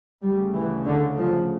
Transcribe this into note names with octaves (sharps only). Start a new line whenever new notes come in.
D2 C#3 G3
E3
D3
F3